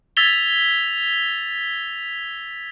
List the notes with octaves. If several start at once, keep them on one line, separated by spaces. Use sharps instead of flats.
E6 G#6 A6 B6 F7 G7